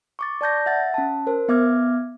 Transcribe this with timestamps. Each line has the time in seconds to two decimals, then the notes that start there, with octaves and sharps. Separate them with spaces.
0.19 C#6 D6 A6
0.41 D5 A5 G6 A#6
0.66 E5 F#5 A6
0.94 C#4 A5
1.27 A#4 C5
1.48 B3 E5 D6 F6 G#6